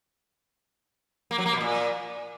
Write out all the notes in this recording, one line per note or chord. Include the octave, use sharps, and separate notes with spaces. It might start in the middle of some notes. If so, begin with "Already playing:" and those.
A#3
F#3
A#3
B2
A#2